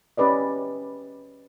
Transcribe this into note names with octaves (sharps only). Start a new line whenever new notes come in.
C#4 G4 B4 D5 D#5